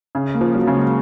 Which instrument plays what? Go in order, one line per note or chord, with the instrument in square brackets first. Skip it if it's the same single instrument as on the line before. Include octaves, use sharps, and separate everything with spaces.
[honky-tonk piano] C#3
[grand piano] A#3
[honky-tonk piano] F3
[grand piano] F#3
[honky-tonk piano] C#3
[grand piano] G#3